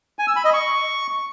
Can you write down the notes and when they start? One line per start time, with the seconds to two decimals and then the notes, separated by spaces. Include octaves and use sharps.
0.19 G#5
0.27 E6
0.36 B5
0.45 D#5
0.53 C#6